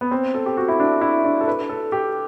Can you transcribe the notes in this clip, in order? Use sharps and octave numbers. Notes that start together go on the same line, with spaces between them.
B3
C4
A4
G4
F#4
E4
D4
E4
D4
A4
B4
A4
G4